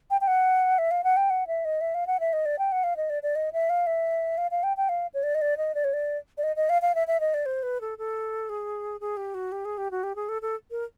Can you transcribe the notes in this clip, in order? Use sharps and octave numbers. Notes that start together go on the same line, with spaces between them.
G5
G5
F#5
E5
F5
F#5
G5
F#5
E5
D#5
E5
F5
F#5
E5
D#5
D5
G5
F#5
F5
D#5
D5
D5
D#5
E5
F5
E5
F5
F5
G5
G5
F5
C#5
D5
D#5
D5
D#5
D5
C#5
D5
D5
D#5
D#5
F5
F5
E5
E5
D#5
D5
C5
B4
A4
A4
G#4
G#4
G4
F#4
G4
G#4
G4
F#4
G4
G#4
A4
A4
A#4